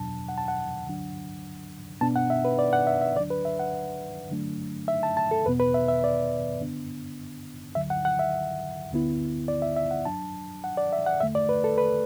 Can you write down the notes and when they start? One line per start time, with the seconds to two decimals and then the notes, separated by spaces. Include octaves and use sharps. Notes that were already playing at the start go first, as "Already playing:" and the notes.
Already playing: E2 B2 F#3 D4 A5
0.29 F#5
0.38 A5
0.48 F#5
0.86 D2 D3 F#3 D4
2.01 B2 B3 D4 A5
2.16 F#5
2.30 E5
2.45 B4
2.59 D5
2.73 F#5
2.87 E5
3.02 E5
3.16 D2 D3 F#3 D4 D5
3.30 B4
3.45 E5
3.59 F#5
4.31 D3 F#3 A3 D4
4.88 E5
5.03 A5
5.17 A5
5.31 A4
5.45 E2 B2 B3 B4
5.60 B4
5.74 E5
5.88 E5
6.04 D5
6.61 F#2 D3 B3 D4
7.75 D2 D3 F#3 E5
7.90 F#5
8.05 F#5
8.19 E5
8.91 D2 D3 B3 E4
9.48 D5
9.62 E5
9.76 E5
9.91 F#5
10.05 F#2 F#3 D4 A5
10.64 F#5
10.77 D5
10.93 E5
11.06 F#5
11.20 E2 D3 A3 E5
11.35 D5
11.49 B4
11.64 A4
11.78 B4